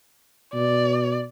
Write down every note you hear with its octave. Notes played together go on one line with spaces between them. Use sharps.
B2 D5